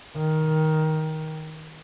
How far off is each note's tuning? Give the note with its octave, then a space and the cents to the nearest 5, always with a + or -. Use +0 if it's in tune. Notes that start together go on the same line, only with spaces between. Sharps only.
D#3 +10